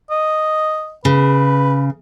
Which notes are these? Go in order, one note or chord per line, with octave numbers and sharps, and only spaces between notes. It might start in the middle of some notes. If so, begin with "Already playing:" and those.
D#5
C#3 B4